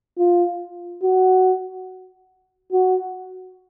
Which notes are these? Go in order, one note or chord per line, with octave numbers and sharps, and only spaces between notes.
F4
F#4
F#4